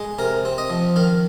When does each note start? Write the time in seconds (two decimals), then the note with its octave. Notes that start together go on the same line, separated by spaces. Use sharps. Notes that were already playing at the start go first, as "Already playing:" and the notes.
Already playing: G#3
0.18 C3 A#4
0.45 C4
0.58 D#5
0.70 F3
0.96 D#3 F5